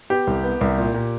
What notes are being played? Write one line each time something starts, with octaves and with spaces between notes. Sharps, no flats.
B3 G4
C2
B3
C2
A#2
A#2